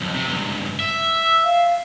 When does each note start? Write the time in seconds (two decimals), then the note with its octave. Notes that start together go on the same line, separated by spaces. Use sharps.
0.01 B1 F2
0.14 C3
0.27 C#2 G2
0.80 E5
1.22 E6
1.44 F5